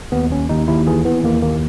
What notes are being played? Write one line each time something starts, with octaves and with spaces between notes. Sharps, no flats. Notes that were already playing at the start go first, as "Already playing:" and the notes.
D#2 B3
D#2 C#4
D#2 D#4
D#2 E4
E3 G#4
E3 B3
D#2 A#3
D#2 A#3